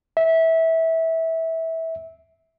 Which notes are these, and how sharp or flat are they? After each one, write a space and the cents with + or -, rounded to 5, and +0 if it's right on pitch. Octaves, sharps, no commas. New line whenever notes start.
E5 -20